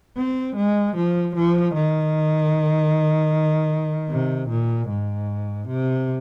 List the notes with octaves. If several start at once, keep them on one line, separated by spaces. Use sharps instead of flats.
C4
G#3
F3
F3
D#3
C3
A#2
G#2
C3